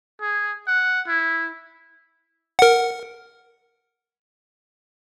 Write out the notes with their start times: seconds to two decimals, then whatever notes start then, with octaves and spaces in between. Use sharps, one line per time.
0.21 G#4
0.67 F#5
1.08 E4
2.59 A#4 F#5